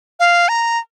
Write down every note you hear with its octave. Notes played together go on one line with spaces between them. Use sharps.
F5
A#5